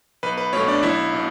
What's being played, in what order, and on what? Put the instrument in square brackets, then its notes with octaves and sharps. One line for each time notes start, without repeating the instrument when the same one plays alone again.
[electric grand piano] B1 B4
B4
B2 C#5
A3
D4 D5
B1 E4 E5
B2